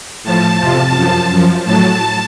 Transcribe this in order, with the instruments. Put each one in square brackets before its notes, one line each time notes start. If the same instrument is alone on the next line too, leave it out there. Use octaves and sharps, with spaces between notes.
[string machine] A2 F3 A5
F2 C3 F3
F#2
F3
F#2 F3
A2 F#3 A5